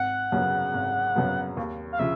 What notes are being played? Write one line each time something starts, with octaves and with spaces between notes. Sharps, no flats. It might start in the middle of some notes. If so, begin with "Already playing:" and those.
Already playing: G#1 F#5
F#2 C#3 F#3 B3
G#1
F#2 C#3 F#3 B3
D#2
F5
C#3 F3 E5